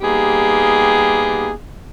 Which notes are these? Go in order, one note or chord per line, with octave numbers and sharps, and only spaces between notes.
G3 A#3 B3 D#4 G4 G#4